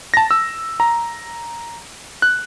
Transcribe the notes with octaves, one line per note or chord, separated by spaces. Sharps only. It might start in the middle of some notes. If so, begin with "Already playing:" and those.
A5 A#6
E6
A#5
F#6